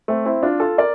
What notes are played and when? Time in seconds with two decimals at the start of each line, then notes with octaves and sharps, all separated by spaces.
0.08 A3 C4
0.25 C4 E4
0.43 D4 F4
0.60 F4 A4
0.78 A#4 D5